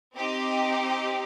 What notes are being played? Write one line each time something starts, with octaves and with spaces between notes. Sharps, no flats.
C4 D#4 G4